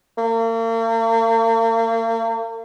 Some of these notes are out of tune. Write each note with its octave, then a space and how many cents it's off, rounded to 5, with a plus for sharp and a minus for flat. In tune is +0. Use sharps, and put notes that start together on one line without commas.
A#3 -40